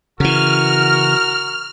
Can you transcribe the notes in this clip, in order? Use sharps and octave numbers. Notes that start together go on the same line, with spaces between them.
C#3 E3 F#4 A#4 F6